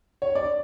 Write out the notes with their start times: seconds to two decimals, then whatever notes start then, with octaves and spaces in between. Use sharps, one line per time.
0.22 C#5
0.35 D5